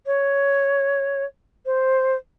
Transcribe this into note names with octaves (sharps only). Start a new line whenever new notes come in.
C#5
C5